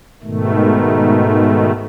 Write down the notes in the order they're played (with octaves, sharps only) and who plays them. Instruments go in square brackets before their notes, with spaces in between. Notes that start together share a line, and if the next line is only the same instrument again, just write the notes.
[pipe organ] G#2 B2 D#3 A3